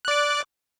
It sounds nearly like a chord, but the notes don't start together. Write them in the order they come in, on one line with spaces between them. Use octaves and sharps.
F#6 D5 D6